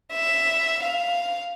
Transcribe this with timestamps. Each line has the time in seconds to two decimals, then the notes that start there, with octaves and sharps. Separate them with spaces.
0.13 E5
0.83 F5